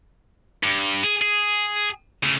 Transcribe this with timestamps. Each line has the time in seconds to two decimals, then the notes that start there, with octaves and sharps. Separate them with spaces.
0.63 G2
1.04 G#4
1.22 G#4
2.23 C#3 A3